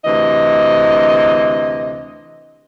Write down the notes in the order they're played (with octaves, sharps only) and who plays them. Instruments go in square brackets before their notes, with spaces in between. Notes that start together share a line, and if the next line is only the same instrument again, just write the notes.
[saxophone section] D2 C3 E3 D#5